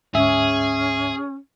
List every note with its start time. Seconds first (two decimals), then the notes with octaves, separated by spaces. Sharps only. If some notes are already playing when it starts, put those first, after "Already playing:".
0.15 D2 G#2 C#4 G#4 E5